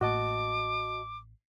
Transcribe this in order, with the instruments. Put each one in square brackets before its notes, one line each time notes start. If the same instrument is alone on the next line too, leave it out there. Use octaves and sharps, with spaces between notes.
[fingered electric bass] A1 A2 A#3 [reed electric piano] F#4 D#5 A5 [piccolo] D6